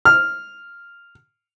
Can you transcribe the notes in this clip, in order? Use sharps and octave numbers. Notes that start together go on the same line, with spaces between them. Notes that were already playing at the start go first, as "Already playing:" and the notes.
F6